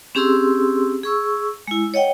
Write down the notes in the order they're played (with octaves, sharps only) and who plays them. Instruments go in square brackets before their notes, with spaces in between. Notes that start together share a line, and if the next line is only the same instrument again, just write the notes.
[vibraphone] C4 C#4 G4 G#4 C6 E6
G#4 C#6 E6
G#3 E4
C#5 D#5 F#5 G5